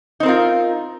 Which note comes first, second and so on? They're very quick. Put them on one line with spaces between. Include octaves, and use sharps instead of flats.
D#4 C4 A#4 F4